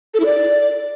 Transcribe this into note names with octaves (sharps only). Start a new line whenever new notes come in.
A4
E4
D5